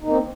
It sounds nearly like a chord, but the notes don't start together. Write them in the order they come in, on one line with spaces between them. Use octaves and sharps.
D#4 A#3 C4